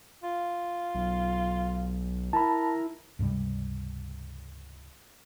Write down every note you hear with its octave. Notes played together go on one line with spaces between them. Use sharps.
F4
B1
E4 A#4 A5 B5
C#2 G2 C3 G3